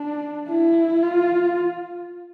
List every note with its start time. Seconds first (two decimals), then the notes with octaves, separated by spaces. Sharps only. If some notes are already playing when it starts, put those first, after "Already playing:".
Already playing: D4
0.49 E4
1.02 F4